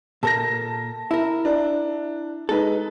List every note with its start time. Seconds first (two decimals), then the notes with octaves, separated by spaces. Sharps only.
0.23 A#2 A4 A#4 A5 A#6
1.11 E4 A#4
1.45 D4
2.49 G#3 D#4 A4 B4